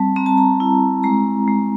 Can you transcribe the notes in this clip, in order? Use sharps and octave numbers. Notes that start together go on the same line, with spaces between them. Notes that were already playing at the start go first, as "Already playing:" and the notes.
Already playing: G3 C4 A5
C4 A#5
A5
A#5
E4
G#3 A#5
G#3